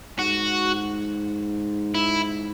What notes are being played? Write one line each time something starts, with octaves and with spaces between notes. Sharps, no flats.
G#2 F#4
E4